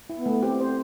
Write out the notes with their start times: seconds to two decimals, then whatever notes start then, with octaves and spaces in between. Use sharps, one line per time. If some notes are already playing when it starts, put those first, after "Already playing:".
0.09 E4
0.17 B3
0.26 A3
0.42 C4 G4
0.60 C5